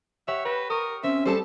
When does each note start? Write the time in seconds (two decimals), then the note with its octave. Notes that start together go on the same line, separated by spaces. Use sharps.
0.28 G4 C#5 E5 F#5
0.45 B4 G6 A#6 E7
0.70 A#4 C#6 D#6
1.04 C4 C#4 E5
1.25 G3 A4 C5 A5